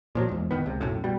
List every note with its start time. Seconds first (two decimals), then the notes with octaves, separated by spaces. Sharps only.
0.15 A#2 F3 F#3
0.29 E2 G#2
0.51 D1 F#2 D#3 B3
0.66 C#2 C3
0.81 B1 F#2 A2
1.04 B2 G3